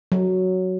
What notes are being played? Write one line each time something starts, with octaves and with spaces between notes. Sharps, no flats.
F#3